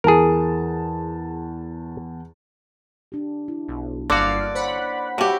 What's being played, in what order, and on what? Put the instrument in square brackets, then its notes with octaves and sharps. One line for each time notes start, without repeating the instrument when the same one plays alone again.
[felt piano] E2 A5 [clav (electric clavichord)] G#4 A#4
[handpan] D4 G4
E4
[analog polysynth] B1
[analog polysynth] G1 F5 [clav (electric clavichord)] D3 F#4 [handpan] A#3 [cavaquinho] D5
[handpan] C5 C#5 [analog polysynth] F#5 B5
[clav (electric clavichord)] G2 [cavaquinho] F#4 G4 [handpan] C#5 E5